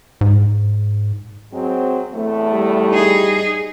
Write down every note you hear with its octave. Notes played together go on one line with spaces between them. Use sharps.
G#2
F#3 G#3 C4
E2 A2 A3
G3
D#4 G#4